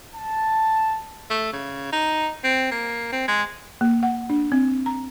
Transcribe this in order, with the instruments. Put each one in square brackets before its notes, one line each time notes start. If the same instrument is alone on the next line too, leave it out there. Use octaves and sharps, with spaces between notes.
[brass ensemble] A5
[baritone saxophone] A3
C#3
D#4
C4
A#3
C4
G#3
[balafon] A#3
F#5
D4
C4
A#5